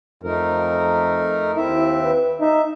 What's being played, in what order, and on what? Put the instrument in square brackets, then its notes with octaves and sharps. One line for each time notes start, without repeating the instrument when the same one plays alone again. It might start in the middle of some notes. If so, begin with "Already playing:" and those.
[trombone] F2 [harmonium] A3 D#4 A#4
[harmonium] D#2 C4 E5 [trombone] E4
[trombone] B4
[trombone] D#4 [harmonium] E5